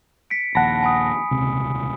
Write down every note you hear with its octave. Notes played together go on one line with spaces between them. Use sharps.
B6 C#7 D7
A#1 D#2 F#5 A5 B5 A#6
G#5 B5 D#6
D#1 C#2 C3